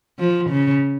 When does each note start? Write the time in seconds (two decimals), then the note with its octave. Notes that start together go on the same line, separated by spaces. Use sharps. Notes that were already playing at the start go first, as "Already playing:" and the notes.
0.19 F3
0.50 C#3